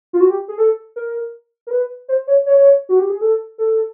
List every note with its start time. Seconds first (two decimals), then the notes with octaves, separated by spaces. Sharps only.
0.13 F4
0.20 F#4
0.30 G4
0.48 G#4
0.58 A4
0.96 A#4
1.67 A#4
1.71 B4
2.08 C5
2.27 C#5
2.46 C#5
2.89 F#4
2.99 G4
3.10 G#4
3.21 A4
3.58 A4